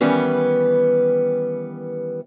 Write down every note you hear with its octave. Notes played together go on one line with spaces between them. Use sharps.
D#3 E3 G3 B3 C#4